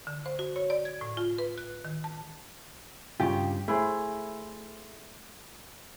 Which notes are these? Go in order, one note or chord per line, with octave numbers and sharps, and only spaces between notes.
D3
C5
F#4
C#5
D5
G#6
A2
F4
B4
F#6
D#3
A5
G2 C#3 F4 G4
A3 E4 G#4 C5